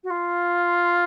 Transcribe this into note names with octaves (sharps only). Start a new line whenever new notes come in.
F#4
F4